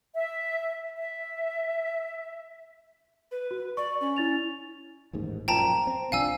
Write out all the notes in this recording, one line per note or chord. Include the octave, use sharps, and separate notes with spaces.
E5
E5
B4
F#4
D5 C#6
C#4
E4 A6 F7
A1 D#2 G#2
F#2 A#2 F3 G5 A5 A#5
C4
C2 F3 D4 F5 G#5 E6